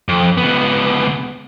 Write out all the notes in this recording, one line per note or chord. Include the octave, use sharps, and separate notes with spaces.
F2
C#2 B3